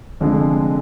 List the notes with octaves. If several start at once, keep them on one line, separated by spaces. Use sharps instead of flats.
F1 F2 D3 G#3